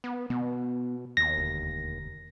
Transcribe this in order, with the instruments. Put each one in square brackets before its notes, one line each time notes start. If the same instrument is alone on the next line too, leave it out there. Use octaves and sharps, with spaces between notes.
[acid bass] B3
[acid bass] B2 [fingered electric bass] B3
[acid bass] D#2 [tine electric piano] A#6
[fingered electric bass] E1 D2